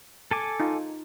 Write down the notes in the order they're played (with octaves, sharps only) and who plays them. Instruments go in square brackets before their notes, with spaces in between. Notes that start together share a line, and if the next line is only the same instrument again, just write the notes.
[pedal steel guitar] A4 G#5 D6
[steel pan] D#4 F4